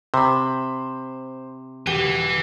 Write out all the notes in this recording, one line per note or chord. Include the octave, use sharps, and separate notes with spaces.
C3 C5 B5
E1 G4 B4 G#5 G7